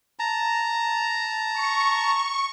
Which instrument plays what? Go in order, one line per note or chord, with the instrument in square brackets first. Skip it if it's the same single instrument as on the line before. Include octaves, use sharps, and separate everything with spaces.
[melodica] A5 A#5
[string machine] C#6